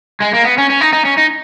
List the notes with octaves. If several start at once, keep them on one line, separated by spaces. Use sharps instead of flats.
G#3
A#3
B3
C#4
C#4
D#4
D#4
C#4
D#4